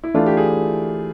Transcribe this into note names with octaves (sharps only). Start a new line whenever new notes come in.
E4
E3 A3 D4 F4
G4
G#4
G4